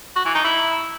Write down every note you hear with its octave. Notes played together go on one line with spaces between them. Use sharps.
F#4
E3
D#4
E4